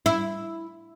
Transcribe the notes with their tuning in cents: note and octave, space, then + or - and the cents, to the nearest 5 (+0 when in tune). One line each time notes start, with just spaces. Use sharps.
E4 +0